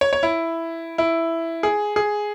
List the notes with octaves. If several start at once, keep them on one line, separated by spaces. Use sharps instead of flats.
C#5
C#5
E4
E4
G#4
G#4